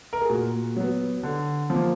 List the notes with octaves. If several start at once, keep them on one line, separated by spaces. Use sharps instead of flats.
A#4
G#4
A#2 F#4
F#3 B3
D3
F3 A#3